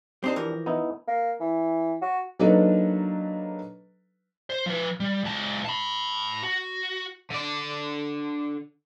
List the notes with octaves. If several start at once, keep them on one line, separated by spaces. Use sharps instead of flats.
C4 D4 D#4 G4 C5
E3 F3 A#4
B3 D#4 E4
A#3
E3
F#4
F#3 A#3 D4 D#4 A4 B4
C5
F3 B4
G3
C#2 A5
A5 B5
F#4
D3 D5